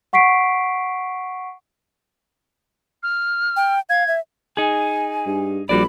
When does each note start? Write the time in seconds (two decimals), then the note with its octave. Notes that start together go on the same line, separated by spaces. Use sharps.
0.13 F#5 C#6 B6 C7 D7
3.03 F6
3.56 G5
3.89 F5 G#6
4.08 E5
4.57 D#4 G#4 G#5
5.26 G2
5.69 A#1 G3 F#4 D5 B5